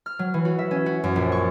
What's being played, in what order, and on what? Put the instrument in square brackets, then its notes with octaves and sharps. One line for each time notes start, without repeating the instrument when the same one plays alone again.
[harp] F6
F#3
E3
F#4
E5
C#4
F#4
F#2
A#1
C#6